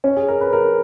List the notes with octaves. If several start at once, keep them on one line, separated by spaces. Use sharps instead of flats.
C#4
G#4
A#4
B4
A#4